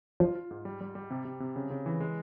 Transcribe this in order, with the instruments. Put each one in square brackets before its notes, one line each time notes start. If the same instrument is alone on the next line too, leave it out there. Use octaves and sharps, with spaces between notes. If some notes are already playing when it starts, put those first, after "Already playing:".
[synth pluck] F3 [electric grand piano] F4
[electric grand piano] F4
G#2
G3
G3
G3
C3
C3
C3
C#3
C#3
E3
G#3